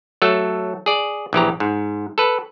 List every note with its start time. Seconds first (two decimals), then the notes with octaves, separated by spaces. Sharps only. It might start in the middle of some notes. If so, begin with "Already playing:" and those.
0.22 F#3 A3 A4
0.86 G#4 D5
1.33 A#1 E3 G4 A#5
1.60 G#2
2.18 A4 B4